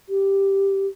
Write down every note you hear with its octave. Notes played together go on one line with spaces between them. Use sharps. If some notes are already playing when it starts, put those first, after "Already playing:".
G4